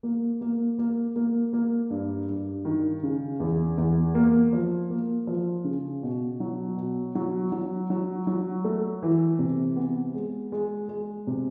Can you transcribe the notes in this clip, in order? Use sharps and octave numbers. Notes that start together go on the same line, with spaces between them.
A#3
A#3
A#3
A#3
A#3
G2
G2
D#3
C#3
E2
E2
A#3
F3
A#3
F3
C#3
B2
F#3
B2
F#3
F#3
F#3
F#3
A3
E3
C3
B3
G#3
G#3
G#3
C3